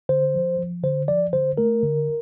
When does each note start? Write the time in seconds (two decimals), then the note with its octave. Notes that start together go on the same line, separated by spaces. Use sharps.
0.09 D3 C5
0.34 F3
0.59 F3
0.84 D3 C5
1.08 F3 D5
1.33 D3 C5
1.58 A3 A#4
1.83 D3